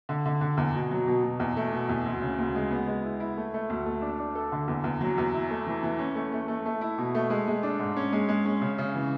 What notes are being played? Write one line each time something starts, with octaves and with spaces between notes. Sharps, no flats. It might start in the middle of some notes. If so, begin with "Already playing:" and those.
D3
D3
D3
E2
B2
F#3
B2
B2
E2
A3
B2
E2
D2
C#3
D2
G#3
B3
G#3
E4
E4
A3
A3
D2
A3
D4
D4
A4
D3
E2
E2
F#3
E2
E4
A3
E3
E3
C#4
A3
A3
A3
A3
E4
B2
A3
G#3
G#3
D4
G#2
C#4
G#3
G#3
C#4
C#3
C#3
E3